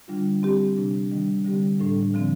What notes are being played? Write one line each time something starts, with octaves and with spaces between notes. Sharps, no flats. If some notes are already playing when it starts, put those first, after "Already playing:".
D3 G3 D4 F4
G3 C4 G4
C3 G3 D4
D#3 G3 D4
D3 G3 C4 G4
A2 G3 D4 A4
D3 F3 C4